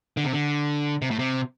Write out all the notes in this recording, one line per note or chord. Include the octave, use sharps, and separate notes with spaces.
D3
C3
D3
C3
A2
C3